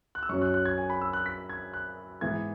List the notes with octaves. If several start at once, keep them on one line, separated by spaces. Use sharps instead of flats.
F#6
E6
F#2 F#3 C#4 C#6
F#6
F#6
G#6
G#5
B5
E6
F#6
B6
G#6
F#6
G#2 E3 B3 G#6